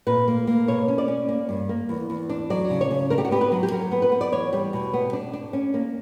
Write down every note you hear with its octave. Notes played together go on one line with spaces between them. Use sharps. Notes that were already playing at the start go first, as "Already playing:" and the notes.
A#2 B4
A#3
A#3
B2 C#5
C#4
D5
C#4
A#3
G2
A#3
E2
E2
D4
F#3 D5
C#3
C#5
C#3
D4 A#4
G4
F#4
B3 G4
B4
F#3
G4
F#3 A#4
B3
B4
B3
D5
E2 C#5
G3
B2
B3
D4
D4
C#4
A#3